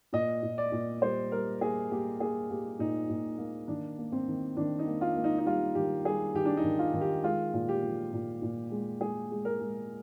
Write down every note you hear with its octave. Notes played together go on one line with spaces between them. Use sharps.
A#2 D#5
A#2
D5
A#2
G3 C5
G3 A#4
A#3 G#4
A#3 G4
A#3 G#4
A#3 G4
A#2 D#4
A#2
A#3
D#3 D4
A#3
C4
D#3
D#3 D4
D#4
A#3
F4
A#3
D#4
D#4
G3 F4
D#3 G4
G3 G#4
D#3 G4
D4
D#4
D#3
F4
D#3
G4
G#3 F4
A#2
G4
F3
A#2
A#2
G#3
G#3 G#4
G#3
A#4
G#3